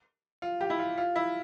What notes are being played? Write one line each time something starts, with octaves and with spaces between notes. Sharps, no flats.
F4
G4
E4
F4
F4
E4